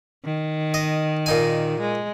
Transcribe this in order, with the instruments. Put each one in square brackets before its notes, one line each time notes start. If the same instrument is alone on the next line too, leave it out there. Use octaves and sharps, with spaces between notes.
[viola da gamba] D#3
[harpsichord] D#5
A#2 D#4 G#5
[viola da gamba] G#3